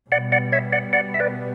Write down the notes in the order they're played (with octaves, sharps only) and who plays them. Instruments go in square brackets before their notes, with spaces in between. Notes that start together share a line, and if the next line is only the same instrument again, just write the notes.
[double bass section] B2 G3 B3 [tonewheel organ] D5 F#5
[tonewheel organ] D5 F#5
C#5 E5
D5 F#5
D5 F#5
E5
B4 D5